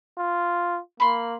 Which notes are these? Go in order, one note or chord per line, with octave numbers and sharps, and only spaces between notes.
F4
A#3 B5 C6